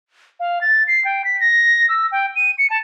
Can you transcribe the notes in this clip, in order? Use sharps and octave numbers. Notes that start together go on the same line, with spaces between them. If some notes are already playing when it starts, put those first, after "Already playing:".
F5
A6
C7
G5
B6
A#6
E6
G5
D#7
C#7
A5